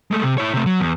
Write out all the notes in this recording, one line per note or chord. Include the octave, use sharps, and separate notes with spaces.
G#3 A3
C3
E4 C#5
C3 A3
F#3
E2